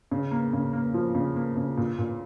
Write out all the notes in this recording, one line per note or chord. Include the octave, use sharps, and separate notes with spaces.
C#3
A#3
C#3
A#3
F3
C#3
A#3
C#3
A#2
A#2